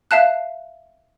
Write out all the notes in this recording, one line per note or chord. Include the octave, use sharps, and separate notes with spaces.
E5 F5 A5 F#6